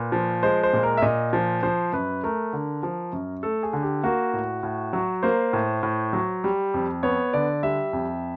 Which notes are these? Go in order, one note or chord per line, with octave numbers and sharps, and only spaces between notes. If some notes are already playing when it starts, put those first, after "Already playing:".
Already playing: A#2 B4
F3
G#3 C5
C5
A#2
A#4
E5
A#2 D#5
F3
F3 C5
F#2 B4
A3 A#4
D3
F3
F#2
A3 A4
G#4
D3
G4
A#3 F#4
A2
A2
F#3
A#3 C5
A2
A2
F#3
G3
F2
B3 C#5
D3 D5
G3 E5
F2